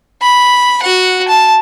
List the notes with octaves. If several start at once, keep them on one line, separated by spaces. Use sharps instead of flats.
B5
F#4 F#5
A5